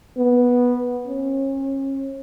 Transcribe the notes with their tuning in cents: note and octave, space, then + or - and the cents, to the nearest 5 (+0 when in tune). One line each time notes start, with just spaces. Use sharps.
B3 -10
C#4 -35